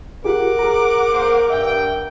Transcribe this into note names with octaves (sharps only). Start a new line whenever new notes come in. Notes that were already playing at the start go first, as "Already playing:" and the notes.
F4 G4 G#4 A#4 F#5 D6
G#4 A#5
A#3 C5
G2 E5 G5